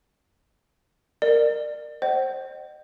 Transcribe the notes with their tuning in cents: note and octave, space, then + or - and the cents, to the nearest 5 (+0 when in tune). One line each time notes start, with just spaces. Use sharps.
A#4 -5 D5 +30
C5 +20 D#5 -40 F#5 +45